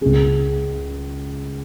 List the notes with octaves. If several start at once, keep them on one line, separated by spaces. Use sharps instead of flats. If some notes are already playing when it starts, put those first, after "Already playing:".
C#2 C#3 G#4